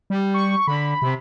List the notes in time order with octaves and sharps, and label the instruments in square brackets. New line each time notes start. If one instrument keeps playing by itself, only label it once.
[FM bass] G3
[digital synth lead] C#6
[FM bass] D3 [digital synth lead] B5
[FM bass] C3